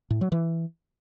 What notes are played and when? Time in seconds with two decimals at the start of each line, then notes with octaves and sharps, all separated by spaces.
0.10 A2
0.21 F#3
0.32 E3